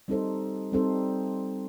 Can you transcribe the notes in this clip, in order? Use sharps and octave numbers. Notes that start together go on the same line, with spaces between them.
G3 C4 D#4 A4 C5
G3 C4 D#4 A4 C5